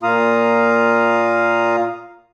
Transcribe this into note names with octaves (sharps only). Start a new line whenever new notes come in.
A#2 A#3 F4 F5 A#5 D#6